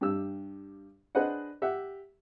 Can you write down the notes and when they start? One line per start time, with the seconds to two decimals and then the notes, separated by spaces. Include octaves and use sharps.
0.01 G2 G4 E6
1.15 D4 G#4 B4 C5 D#5 F#5
1.62 G4 E5 F#5